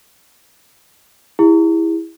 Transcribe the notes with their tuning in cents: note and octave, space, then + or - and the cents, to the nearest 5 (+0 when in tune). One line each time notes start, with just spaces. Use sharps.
E4 +0 G#4 -45